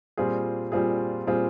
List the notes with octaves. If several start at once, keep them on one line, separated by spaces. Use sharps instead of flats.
A#2 G3 C4 F4 G#4
A#2 G3 C4 F4 G#4
A#2 G3 C4 F4 G#4